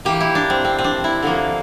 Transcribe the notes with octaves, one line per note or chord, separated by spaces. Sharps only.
E3 A#3 G4
E4
D4
C4
C4
C4
D4
E4
D3 F3 A#3